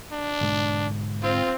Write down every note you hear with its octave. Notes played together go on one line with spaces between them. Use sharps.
D4
G#2 B2 D3
C4 F4